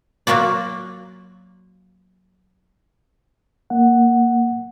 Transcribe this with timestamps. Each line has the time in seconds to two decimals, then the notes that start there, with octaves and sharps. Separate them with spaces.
0.27 F#3 A#3 F4 F#4 D5
3.70 A#3 F#5